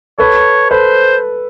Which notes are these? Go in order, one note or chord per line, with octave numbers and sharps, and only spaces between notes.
A4 B4 C#5
A4 B4 C5